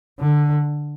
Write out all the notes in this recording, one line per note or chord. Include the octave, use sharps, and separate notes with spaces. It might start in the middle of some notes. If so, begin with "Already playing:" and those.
D3